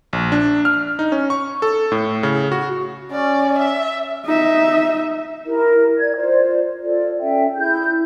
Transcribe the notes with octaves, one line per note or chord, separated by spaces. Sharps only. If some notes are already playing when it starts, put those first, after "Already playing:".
A#1
D4
F6
D#4
C#4
C#6
A4
A2
C#3
F#4
C#4 D5
E5
D#4 E5
E4 G4 A#4
D5 G#6
F4 C5 D5
F4 A4 D5
C#4 A4 E5 G5
E4 G#4 G6